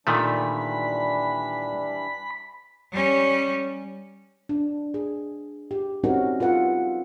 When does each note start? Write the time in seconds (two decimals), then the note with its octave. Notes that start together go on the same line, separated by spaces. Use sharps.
0.07 A#2 D#3 E3 G3 A3 D4 B5
2.92 G3 C#4
4.49 D4
4.94 G#4
5.71 G4
6.04 G3 C4 C#4 D#4 F#4 A#4
6.40 F4 A4 B4 F#5